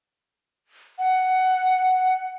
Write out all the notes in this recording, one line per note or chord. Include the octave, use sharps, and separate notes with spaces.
F#5